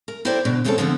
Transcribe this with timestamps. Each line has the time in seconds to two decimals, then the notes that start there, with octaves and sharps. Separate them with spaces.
0.08 A#4
0.25 E4 G4 A4 A#4 C5 D5
0.45 B2 D3 D4
0.64 E2 G#3 C4 C#4 G4 A4
0.78 D3 F3 B3 C4 A#4 C5